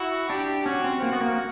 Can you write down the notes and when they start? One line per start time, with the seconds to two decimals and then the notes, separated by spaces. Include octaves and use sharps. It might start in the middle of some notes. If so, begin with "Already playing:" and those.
Already playing: E4 F#4
0.30 D4 G4
0.66 C#4 F#4
0.84 C4
1.02 A#3 F#4
1.12 B3
1.21 A#3